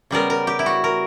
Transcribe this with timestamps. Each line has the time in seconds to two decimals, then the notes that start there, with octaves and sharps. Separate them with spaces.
0.11 C#3 G3 B3 A#4
0.30 A#4
0.47 G4
0.59 E4
0.66 F#4
0.84 A#4